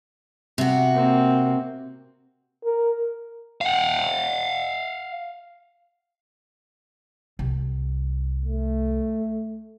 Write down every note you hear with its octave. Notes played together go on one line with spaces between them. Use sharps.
C3 F#4
A#3 C4
A#4
F5 F#5
C2
A3